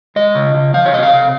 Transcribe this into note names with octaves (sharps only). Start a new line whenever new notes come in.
G#3 D#5
C#3
C#3
F3 F5
C#5
C3 D#5
F5
C3